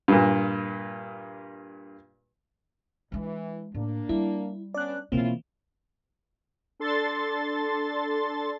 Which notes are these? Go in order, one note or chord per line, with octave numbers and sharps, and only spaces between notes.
G2 A#2
E3 G#3 D4
A2 A#3 D4
G3 E4
B3 C#4 D4 D5 F#6
B2 E3 A#3 C4 C#4 E4 F4
D4 A4 C6 A6